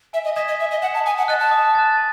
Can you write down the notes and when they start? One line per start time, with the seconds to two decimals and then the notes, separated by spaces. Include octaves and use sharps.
0.13 E5 G#5
0.24 D#5
0.36 D#5 D#6 G#6 B6 E7
0.48 D#5
0.59 E5 G#5
0.71 D#5
0.82 F#5 D#6 G#6 B6 E7
0.94 A5
1.06 G#5 D#6
1.18 F#5
1.28 D#5 F#6 A6
1.40 A5
1.51 D#6
1.75 F#6 A6
1.97 A5